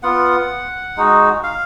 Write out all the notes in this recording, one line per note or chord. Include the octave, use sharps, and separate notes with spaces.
B3 F4 F#5
G#3 D#4 F#4
F5